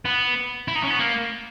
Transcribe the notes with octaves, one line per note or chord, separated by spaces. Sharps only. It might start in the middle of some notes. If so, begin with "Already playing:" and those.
B3
E4
D#4
C#4
B3
A#3